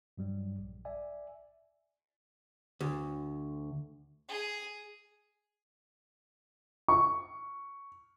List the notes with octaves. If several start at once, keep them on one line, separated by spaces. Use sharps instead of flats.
G2 F#3 G3
A#1
D5 E5 G#5
D2
G#4
C#6